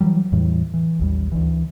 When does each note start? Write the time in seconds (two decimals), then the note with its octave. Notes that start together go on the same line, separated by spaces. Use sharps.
0.01 E3 F#3 G3
0.32 E2 A2 E3 G3
0.74 E3
0.99 A1 D#2 G3
1.32 D2 E3